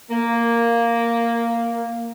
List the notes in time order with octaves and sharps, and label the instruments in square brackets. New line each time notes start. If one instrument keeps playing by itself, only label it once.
[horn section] A#3